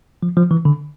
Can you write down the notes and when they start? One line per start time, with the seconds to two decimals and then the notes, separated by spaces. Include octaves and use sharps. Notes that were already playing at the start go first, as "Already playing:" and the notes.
0.23 F3
0.37 F3
0.51 E3
0.65 D3